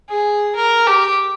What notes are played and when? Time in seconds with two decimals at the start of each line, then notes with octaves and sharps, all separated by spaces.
0.09 G#4
0.56 A#4
0.87 G4